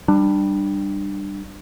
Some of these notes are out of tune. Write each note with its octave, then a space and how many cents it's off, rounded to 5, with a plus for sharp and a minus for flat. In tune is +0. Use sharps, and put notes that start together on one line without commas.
G3 +0 D4 +20